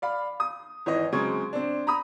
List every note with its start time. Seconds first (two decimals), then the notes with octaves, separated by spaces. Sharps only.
0.02 D5 F5 B5
0.40 D#6
0.86 G#1 E3 C#5 D#5
1.12 C#3 F#3 G#3 C4 C#6 G#6
1.53 C4 D4
1.87 A#5 B5 D#6